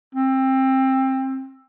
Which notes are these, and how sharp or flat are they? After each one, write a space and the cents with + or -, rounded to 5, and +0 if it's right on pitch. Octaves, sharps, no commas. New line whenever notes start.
C4 +20